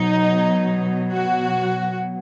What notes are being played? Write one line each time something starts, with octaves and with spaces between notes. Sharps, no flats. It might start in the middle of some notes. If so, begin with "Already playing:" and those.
Already playing: B2 F#3 D#4
F#4